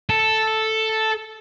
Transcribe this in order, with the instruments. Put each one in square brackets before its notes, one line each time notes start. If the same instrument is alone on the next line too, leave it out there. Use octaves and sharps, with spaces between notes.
[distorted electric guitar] A4